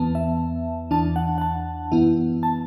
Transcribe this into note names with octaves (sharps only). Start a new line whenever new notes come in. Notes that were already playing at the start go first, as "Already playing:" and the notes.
Already playing: E2 E3 B3 A5
E5
E2 E3 D4 A5
F#5
F#5
A5
F#2 E3 B3 E4
A5